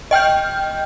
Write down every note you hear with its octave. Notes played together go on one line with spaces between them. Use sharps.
D#5 G5 F6 G6